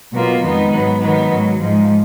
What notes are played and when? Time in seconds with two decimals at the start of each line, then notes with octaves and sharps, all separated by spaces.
0.11 B2 F#3 A#3 F4
0.41 F2 D#3 G#3 B3 D#4
0.70 G#2 F#3 B3
0.99 D#3 F#3 B3 D#4
1.28 G#2 D#3 F#3
1.58 G#2 F3 G#3 D#4